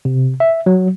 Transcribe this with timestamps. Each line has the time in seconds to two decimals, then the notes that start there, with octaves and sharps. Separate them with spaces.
0.05 C3
0.40 E5
0.66 F#3